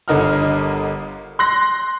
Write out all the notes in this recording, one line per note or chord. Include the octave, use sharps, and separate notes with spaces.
G1 D3 A#4 D#5 F#5 F6
C6 F#6 A#6